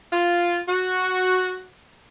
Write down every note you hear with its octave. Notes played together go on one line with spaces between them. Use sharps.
F4
F#4